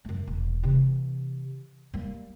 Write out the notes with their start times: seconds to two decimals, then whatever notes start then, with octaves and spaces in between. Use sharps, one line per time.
0.05 F#2 A3
0.27 E1
0.63 C3 E3
1.94 G3 A#3